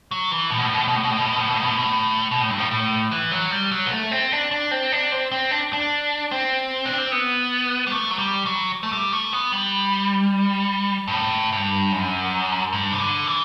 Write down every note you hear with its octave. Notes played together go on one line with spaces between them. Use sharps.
F#3
E3
A2
B2
A2
B2
A2
B2
A2
B2
A2
B2
A2
B2
A2
B2
A2
B2
A2
B2
A2
B2
A2
G2
A2
A2
E3
F#3
G3
F#3
B3
A3
C4
D4
D4
C4
D4
C4
C4
D4
D4
C4
D4
C4
B3
G3
A3
F#3
G3
F#3
A3
G3
A3
B3
G3
G2
A2
G2
F#2
G2
C3
D3
E3